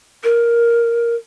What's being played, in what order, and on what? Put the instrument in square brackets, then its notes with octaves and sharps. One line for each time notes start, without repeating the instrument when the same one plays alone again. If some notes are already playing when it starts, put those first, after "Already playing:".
[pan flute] A#4